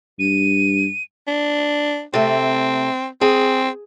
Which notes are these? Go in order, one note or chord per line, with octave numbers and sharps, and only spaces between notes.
G2 D#7
D4
C3 A3 C4
C4 G#4